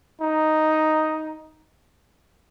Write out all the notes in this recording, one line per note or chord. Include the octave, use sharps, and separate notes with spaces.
D#4